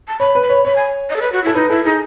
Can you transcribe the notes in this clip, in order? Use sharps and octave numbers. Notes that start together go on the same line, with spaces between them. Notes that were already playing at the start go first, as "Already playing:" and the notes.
A5
C#5 B5
B4
B5
C#5
C#5 B5
G#5
D#5
A4
B4
F#4
E4 A4
D#4 B4
E4 A4
D#4 G#4